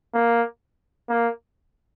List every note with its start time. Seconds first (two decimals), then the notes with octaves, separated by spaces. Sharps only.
0.15 A#3
1.09 A#3